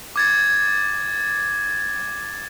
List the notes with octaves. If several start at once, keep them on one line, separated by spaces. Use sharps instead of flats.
D6 G#6 A6